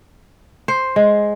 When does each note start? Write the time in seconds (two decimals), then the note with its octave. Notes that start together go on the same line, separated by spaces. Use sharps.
0.68 C5
0.96 G#3